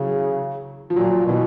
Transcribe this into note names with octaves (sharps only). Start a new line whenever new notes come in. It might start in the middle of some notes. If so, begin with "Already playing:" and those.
Already playing: C#3 E3 F#3
F3
A#2 F#3
B2 E3